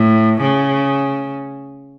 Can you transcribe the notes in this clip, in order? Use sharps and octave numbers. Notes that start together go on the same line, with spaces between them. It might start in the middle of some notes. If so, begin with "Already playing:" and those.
Already playing: A2
C#3